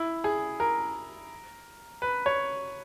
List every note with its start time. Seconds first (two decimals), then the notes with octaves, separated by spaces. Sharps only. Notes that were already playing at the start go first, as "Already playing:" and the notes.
Already playing: E4
0.24 G#4
0.60 A#4
2.02 B4
2.26 C#5